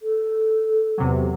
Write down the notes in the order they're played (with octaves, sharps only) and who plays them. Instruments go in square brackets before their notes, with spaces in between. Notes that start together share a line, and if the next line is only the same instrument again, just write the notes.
[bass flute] A4
[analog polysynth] E2 C3 F#3